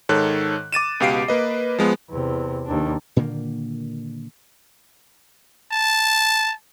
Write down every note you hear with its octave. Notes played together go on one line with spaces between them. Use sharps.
G#2 D#3 A4 C#5 F#6
D6 A6 D#7 E7
C#2 B2 G4 F5 C7 D7
A#3 B4 D#5
F3 G#3 B3
E2 C3
D#2 D4
A#2 D3 D#3 A#3
A5